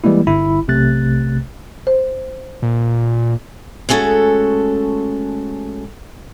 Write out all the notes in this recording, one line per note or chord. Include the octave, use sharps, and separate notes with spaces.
E3 G3 G#3 A#3 E4
G1 E4 B5
B1 C3 A3 F#6 A6
C5
A#2
G#3 A3 C#4 F#4 A4